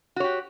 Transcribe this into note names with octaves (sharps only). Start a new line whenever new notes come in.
F#4 G4 C#5